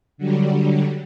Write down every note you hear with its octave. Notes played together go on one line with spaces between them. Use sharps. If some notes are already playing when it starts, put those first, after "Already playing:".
D3 F#3 G3